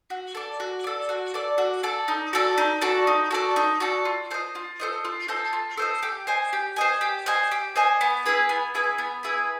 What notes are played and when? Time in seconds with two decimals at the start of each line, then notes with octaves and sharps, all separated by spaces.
0.10 F#4
0.35 A4 D5
0.60 F#4
0.84 A4 D5
1.09 F#4
1.34 A4 D5
1.58 F#4
1.83 A4 D5
2.08 D#4
2.33 F#4 A4 D5
2.58 D#4
2.82 F#4 A4 D5
3.07 D#4
3.31 F#4 A4 D5
3.56 D#4
3.80 F#4 A4 D5
4.05 F4
4.31 A4 C5 D#5
4.55 F4
4.80 A4 C5 D#5
5.05 F4
5.28 A4 C5 D#5
5.53 F4
5.77 A4 C5 D#5
6.03 G4
6.27 C5 D#5 G#5
6.53 G4
6.76 C5 D#5 G#5
7.01 G4
7.26 C5 D#5 G#5
7.51 G4
7.76 C5 D#5 G#5
8.01 B3
8.26 E4 G#4 B4
8.49 B3
8.75 E4 G#4 B4
8.98 B3
9.23 E4 G#4 B4